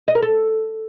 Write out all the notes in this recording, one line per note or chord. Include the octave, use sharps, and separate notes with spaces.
D#5
A#4
A4